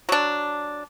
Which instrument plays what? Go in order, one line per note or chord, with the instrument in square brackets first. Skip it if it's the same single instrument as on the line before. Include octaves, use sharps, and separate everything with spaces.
[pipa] F#3 D4